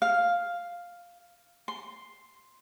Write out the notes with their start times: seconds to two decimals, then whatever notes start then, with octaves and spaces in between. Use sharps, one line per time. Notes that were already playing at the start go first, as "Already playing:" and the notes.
0.02 F5
1.68 C6